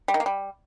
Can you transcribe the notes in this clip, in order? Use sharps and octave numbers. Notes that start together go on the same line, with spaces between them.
G3
D#3
A#3
G3